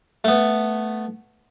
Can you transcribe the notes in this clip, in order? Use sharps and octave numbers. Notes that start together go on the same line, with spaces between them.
A3 B3